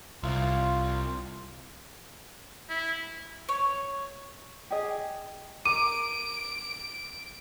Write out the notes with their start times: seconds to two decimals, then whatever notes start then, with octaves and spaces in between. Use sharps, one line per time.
0.23 C2 F4
2.69 E4
3.49 C#5
4.70 G4 G#4 D#5
5.65 A#4 D6 D7 D#7